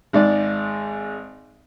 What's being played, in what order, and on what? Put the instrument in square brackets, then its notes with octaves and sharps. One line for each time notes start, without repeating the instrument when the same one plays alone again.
[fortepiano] G#1 G#2 D5